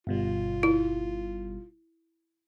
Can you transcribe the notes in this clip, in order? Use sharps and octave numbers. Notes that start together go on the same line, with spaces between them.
G1 B2 G3 F4
E4